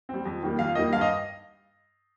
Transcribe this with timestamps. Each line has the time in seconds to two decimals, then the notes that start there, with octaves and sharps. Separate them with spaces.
0.09 G3 C4
0.25 F2
0.43 D#3 G3 A#3
0.59 F2 F5
0.75 D#3 G3 A#3 D#5
0.93 G2 F5
1.01 D#5